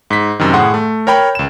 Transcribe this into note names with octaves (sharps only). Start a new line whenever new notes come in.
G#2 B6
F#2 C3 D#3
A2 G#4 F#5 C6
A3
A#4 C#5 G5 B5
C#2 E7